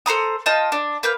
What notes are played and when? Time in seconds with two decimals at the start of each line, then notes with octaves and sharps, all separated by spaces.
0.06 A4 C5 A#5 D#6
0.46 F4 D#5 G5 A5
0.72 D4
1.03 A#3 B4 F5 G6